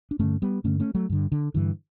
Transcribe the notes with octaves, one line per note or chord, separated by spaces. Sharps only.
D4
G2 D3 A3 C#4
G3 B3
G2 D3 A3 C#4
A3 C#4
F#3 A3
G2 D3
D3
G2 D3 E3